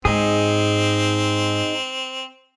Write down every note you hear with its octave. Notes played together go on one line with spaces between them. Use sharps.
G#2 C4 D#4 G#4